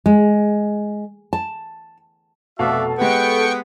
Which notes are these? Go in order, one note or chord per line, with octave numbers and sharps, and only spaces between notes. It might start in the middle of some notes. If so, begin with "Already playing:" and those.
G#3
A5
F1 B2 F#4 A4 D5 E5 F5
G#3 B3 G4 G5 C#6